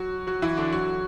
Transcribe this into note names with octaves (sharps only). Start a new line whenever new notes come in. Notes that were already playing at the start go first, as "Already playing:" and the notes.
Already playing: F#3 F#4
F#3 F#4
E3 E4
D3 D4
F#3 F#4